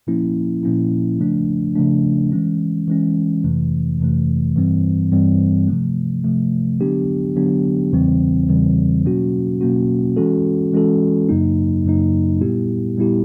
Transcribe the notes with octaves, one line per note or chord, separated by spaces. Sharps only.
A#2 F3 A#3 C#4 E4
A#2 F3 A#3 C#4 E4
C#3 F3 A3 D4
C#3 F3 A3 D4
E3 G#3 C#4
E3 G#3 C#4
F2 C3 E3 A3
F2 C3 E3 A3
G2 E3 G3 C4
G2 E3 G3 C4
C3 F3 A3
C3 F3 A3
D3 F#3 B3 D4 G4
D3 F#3 B3 D4 G4
E2 C#3 E3 G3 C4
E2 C#3 E3 G3 C4
B2 F#3 A#3 C#4 F#4
B2 F#3 A#3 C#4 F#4
E3 G#3 C#4 F#4 A4
E3 G#3 C#4 F#4 A4
F#2 C#3 F#3 A#3 D#4
F#2 C#3 F#3 A#3 D#4
A#2 G3 B3 E4 G4
A#2 G3 B3 E4 G4